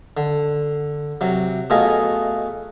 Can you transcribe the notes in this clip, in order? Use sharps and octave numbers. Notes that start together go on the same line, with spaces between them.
D3
C3 F#3
B2 A3 F4 G#4 D#5 A#5